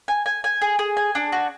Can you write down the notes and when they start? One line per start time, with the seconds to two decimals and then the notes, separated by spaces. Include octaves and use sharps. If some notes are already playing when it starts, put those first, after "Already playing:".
0.08 G#5
0.26 G#5
0.44 G#5
0.62 G#4
0.79 G#4
0.97 G#5
1.15 D4
1.32 F#4